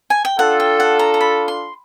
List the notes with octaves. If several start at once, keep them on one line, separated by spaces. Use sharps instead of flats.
G#5
G5
D4 F4 A4 F#5
G5
F#5
A#5
A#5
B5
C6